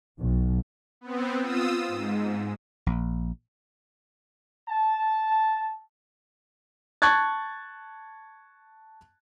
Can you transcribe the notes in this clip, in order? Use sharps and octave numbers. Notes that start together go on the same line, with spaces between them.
B1
B3 C4
F4 D#6 E6
G#2
A#1
A5
A5 C#6 F#6 G#6 A6